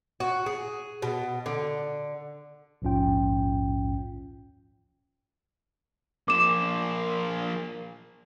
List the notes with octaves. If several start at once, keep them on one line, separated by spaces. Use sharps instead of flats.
F#4
G#4
B2
D3
A#1 D#2 G#2 C#4 F4 G5
F3 A#3 D6 E7